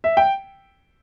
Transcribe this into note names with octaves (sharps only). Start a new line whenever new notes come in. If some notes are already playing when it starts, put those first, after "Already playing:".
E5
G5